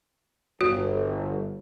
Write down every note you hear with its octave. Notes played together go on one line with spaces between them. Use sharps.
G1 F#4